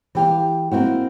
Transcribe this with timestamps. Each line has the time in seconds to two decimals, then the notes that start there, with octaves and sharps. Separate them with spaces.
0.15 E3 G4 F5
0.71 A#3 C4 E4 F#4